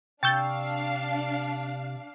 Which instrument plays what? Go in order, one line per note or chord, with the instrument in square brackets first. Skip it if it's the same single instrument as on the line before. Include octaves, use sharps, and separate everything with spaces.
[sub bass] C3 [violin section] D4 F5 [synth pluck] G5 C#6 E6 [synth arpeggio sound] G6 A6